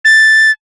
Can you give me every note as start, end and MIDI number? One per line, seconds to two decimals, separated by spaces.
0.05 0.51 93